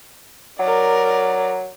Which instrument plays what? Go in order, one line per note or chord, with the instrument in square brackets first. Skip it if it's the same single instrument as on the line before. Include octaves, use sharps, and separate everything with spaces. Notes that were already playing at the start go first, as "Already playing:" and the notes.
[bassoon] F#3 [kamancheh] A#4 D5